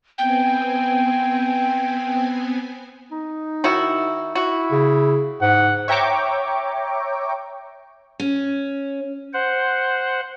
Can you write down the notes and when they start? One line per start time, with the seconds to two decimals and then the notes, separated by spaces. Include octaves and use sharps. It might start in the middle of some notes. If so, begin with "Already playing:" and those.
0.18 B3 C4 G5 G#5
3.11 D#4
3.64 D#3 E4 F#4
4.35 E4 F#4
4.71 C#3
5.41 G#2 F#5
5.88 C#5 E5 G5 A#5 C#6 D6
8.20 C#4
9.33 C5 F#5